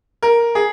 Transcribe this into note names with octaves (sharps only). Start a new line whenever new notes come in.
A#4
G#4